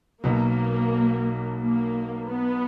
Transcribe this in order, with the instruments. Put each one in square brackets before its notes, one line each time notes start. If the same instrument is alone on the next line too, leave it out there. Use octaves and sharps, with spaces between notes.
[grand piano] B1 B2 F#3 [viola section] A#3
[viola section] A#3
B3